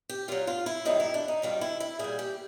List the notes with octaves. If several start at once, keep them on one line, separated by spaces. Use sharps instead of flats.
G4
A#2 F#3 F4
F4
E4
F#2 D#3 G3 D#4
E4
D4
D#4
F#2 D#3 G3 F4
E4
E4
A#2 G3 G#4
G4